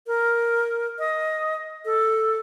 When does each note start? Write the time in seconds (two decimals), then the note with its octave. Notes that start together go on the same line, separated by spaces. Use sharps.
0.07 A#4
0.99 D#5
1.85 A4